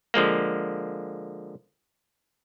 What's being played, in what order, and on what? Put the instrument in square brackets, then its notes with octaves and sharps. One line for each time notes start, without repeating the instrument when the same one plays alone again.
[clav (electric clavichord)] D3 F3 G#3 A#3